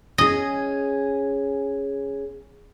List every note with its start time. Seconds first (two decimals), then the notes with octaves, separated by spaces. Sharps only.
0.18 C#4 G#4 D#5